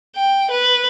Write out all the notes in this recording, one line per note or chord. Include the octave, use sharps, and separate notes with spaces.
G5
B4